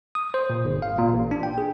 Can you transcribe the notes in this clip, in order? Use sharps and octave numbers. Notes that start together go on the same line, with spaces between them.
D#6
C5
A#2
G1
F5
A#2
A1
D4
G5
G#4